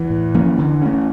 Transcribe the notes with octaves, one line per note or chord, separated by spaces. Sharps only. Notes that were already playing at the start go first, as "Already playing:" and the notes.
Already playing: E2 E3
A2
F3 A#3 C#4
D3
A3 C#4